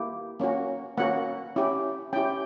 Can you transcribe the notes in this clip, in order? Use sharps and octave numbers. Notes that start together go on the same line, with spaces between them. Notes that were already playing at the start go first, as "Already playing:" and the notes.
Already playing: A#3 E4 G4
A#3 C#4 F#4
A#3 C#4 F#4 F#5
C#4 E4 G4
C#4 E4 G4 G5